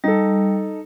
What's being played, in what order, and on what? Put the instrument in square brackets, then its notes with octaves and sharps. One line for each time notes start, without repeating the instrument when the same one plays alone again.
[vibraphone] G3 [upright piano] D#4 A4